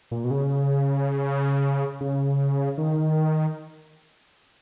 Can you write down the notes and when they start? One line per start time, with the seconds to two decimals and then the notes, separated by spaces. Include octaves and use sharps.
0.11 A#2
0.24 B2
0.31 C#3
2.01 C#3
2.78 D#3